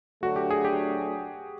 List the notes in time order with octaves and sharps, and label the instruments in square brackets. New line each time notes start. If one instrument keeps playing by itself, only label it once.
[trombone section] D2 D3 F#3 A3 [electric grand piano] F#4
[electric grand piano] G4
G#4
G4